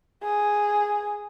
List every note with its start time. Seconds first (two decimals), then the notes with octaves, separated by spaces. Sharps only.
0.23 G#4